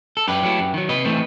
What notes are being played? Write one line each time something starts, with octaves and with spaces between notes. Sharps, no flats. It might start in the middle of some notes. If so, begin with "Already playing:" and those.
A4
F#2 G4 B4
F#3 A3 E4
F#2
D#3 F#3
C3 B4 D#5
E3 A3 C4